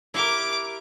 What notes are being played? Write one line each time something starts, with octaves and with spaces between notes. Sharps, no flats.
E4 G4 A#4 D6